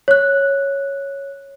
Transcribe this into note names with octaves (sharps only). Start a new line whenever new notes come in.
C#5 F#6